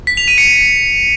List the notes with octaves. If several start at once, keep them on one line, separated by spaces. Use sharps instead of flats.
B6
F7
D#7
C#7